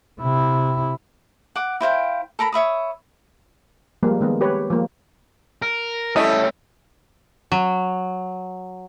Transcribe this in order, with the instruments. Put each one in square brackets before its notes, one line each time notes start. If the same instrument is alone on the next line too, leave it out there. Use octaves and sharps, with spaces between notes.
[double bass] C3 E4
[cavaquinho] F#5 D6
E4 C5 F5 G5
A4 A#4 A#5 B5
C#5 E5 B5 D#6
[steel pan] F3 G3 G#3 A#3
D#3 G#3 B3
G4 B4 C#5
F3 G#3 A#3
[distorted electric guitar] A#4
[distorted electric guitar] G3 A3 [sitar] C#4 [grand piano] E4 A4 E5 [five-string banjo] D#5
[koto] F#3